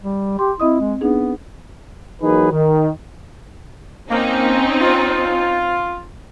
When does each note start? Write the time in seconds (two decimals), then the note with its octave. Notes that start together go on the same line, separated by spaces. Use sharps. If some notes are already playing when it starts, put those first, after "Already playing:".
0.02 G3
0.39 G4 C6
0.60 C4 E4 D#5 D#6
0.80 G#3
1.01 B3 D4 D#4 G#4
2.22 E3 F#3 A#3 D#4 G#4 B4
2.52 D#3
4.11 A#3 C4 C#4 D#4
4.81 F4